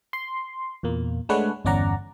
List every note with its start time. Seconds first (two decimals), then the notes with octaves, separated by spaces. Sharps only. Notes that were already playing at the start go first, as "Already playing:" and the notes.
0.13 C6
0.83 E2 A#2 A#3
1.29 G#3 A3 D4 B4 C#5 F#5
1.65 G1 E2 C#4 D5 F#5 A#5